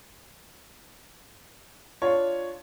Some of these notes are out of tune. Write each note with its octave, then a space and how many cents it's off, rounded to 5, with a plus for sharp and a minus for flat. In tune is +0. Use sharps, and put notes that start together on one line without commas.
D4 +5 F4 +0 C#5 +0